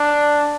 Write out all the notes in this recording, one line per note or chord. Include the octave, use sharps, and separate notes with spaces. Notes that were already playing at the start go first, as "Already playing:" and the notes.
Already playing: D4